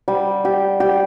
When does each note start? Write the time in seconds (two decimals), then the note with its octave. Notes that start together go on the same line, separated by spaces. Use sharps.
0.08 G3
0.45 G4
0.80 G4